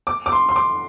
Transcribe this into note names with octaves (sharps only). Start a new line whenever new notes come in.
D6
D6
C6
C6
D6